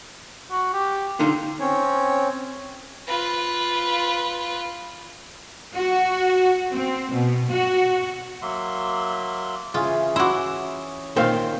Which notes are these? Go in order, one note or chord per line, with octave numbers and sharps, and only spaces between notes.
F#4
G4
D3 D#4 F4 A#5
C4 C#4 C#5
F4 B4
F#4
C4
B2
F#4
F#3 A#3 E5 C6
C#3 E3 C#4 F4 G#4
E4 F#4 C6 D6
A#2 D#3 C4 C5 F5